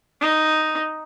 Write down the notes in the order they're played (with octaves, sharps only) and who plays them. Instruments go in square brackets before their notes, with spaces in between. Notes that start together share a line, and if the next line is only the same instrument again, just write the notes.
[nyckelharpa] D#4